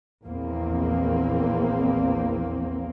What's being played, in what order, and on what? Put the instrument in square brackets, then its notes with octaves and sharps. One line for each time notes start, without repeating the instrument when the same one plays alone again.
[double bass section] A#1 E2 A#3 C4